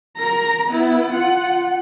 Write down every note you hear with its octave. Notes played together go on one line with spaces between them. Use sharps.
A#4 A#5
B3 E4
F4 F#5